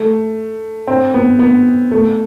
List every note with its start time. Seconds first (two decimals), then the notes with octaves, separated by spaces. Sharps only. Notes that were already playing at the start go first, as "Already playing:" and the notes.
Already playing: A3
0.87 C4
1.14 B3
1.39 B3
1.91 A3